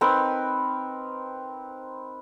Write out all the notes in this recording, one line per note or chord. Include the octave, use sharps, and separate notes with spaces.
C4 D#4 A#4 B4